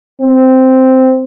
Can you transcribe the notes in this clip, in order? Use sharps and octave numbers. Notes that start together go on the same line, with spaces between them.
C4